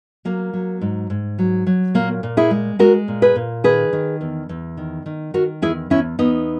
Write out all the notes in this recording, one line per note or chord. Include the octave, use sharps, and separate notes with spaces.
F#3 A#3
F#3
G#2
G#2
F#3
F#3
A#2 A#3
A#2
E4 G#4
G#3
G#3 F#4 A#4
A#2
G#4 B4
A#2
D#3 G#4 B4
D#3
E2
E2
D#3
D#3
D#3 F#4 A#4
E2 E4 G#4
E2 C#4 E4
E2 B3 D#4